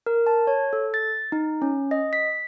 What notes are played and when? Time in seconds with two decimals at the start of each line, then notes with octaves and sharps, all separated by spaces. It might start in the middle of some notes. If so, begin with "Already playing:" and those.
0.06 A#4
0.27 A5
0.47 C#5
0.73 A4
0.94 A6
1.32 D#4
1.62 C#4
1.91 D#5
2.13 B6